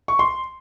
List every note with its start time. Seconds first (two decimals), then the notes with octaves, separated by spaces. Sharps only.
0.08 C#6
0.19 C6